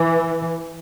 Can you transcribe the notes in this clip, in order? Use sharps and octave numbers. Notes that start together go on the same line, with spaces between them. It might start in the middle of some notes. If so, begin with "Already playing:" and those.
Already playing: E3